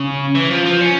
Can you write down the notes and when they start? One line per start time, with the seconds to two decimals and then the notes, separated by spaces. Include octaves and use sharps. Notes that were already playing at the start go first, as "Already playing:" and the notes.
Already playing: C#3
0.35 E3
0.50 F3
0.65 F3
0.81 C#4